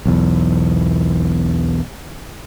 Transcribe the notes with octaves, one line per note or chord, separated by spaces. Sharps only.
B1 E2